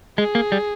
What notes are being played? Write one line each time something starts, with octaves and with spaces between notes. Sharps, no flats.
G#3 G#4
A#3
G3